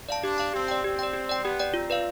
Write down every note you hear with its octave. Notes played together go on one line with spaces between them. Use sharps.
D5 F5 A5
D4 G4
D5 F5 A5
C4 G4
D5 G5
C4 G4
D5 G5
G4
D5 G5
B3 G4
D5 G5
C4 F4
B4 D5 F5